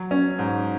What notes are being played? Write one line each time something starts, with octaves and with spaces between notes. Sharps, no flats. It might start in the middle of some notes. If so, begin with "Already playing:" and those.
Already playing: F#3
C#4
G#2